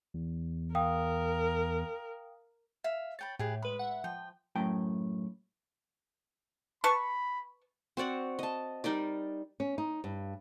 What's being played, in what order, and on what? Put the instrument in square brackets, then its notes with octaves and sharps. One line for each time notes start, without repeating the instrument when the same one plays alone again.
[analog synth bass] E2
[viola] A#4 [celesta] F5 G5 D#6
[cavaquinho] E5 F5
[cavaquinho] C#5 G5 B5 [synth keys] A6
[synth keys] A2 [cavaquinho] G4 G#4 B4
[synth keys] G#3 B4 [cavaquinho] B5
[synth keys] E5 F#5
[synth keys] F3 [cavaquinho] G5
[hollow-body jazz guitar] F#2 A2 G5
[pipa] B4 A5 C#6 [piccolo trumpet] B5
[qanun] C4 F#4 D5 F#5
D#5 A5
G3 D#4 A#4 D5
[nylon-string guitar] C#4
D#4
G2